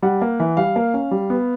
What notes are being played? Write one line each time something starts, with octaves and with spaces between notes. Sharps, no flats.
G3 F#5
A#3
E3
G3 F5
A#3
C#4
G3
B3